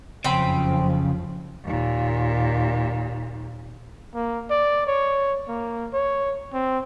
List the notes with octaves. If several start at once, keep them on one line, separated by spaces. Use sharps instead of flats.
F#1 F2 C#3 F3 C4 G5 B5
D#2 A#2
A#3
D5
C#5
A#3
C#5
C4